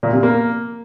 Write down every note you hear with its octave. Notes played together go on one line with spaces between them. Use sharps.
A#2
C3
A#3